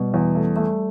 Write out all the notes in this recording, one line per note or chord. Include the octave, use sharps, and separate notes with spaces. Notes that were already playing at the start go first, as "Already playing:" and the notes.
Already playing: B2 G3
E2
A3
A3